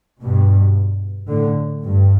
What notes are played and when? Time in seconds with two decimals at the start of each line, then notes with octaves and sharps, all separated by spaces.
0.22 G2 B2
1.28 A2 D3
1.82 G2